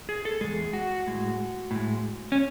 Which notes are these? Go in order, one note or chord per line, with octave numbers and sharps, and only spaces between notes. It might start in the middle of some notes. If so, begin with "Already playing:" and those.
G#4
A4
E2 B2 G#3 G#4
F#4
A2 G#3
A2 G#3
C#4